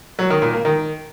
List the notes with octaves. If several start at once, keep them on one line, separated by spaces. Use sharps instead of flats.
F#3
D#3
A#2
A#3
D#3